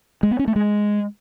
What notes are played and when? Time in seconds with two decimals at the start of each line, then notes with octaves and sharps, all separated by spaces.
0.23 G#3
0.31 B3
0.39 C#4
0.48 A3
0.56 G#3